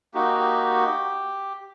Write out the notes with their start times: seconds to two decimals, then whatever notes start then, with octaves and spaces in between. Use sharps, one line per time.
0.14 A#3 D#4 F#4 G4
0.40 G4